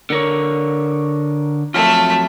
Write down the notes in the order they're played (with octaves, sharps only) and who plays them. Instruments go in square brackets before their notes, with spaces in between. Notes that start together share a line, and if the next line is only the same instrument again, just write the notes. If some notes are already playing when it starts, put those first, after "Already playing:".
[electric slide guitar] D3 A#4 C#5
[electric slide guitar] F2 F#3 F4 [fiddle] A3 E5